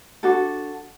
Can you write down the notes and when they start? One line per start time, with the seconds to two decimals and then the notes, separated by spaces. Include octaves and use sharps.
0.23 D4 F#4 A4